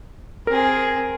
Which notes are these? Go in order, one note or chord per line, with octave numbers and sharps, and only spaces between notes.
C4 G#4 A#4